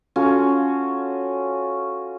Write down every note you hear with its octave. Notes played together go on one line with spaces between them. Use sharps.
C#4 F4 F#4 A4